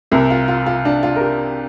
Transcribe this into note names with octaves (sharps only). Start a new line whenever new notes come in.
C2 C3 A#4
F4
F4
F4
D4
F4
A#4
G4